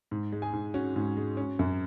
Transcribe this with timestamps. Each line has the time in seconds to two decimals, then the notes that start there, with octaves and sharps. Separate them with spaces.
0.11 G#2
0.32 G#3
0.42 G#4 G#5
0.53 G#2
0.74 C#4 F#4
0.96 G#2
1.17 G#3
1.37 C#4
1.59 F#2